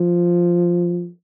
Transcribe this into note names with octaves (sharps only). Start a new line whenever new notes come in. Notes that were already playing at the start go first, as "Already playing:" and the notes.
Already playing: F3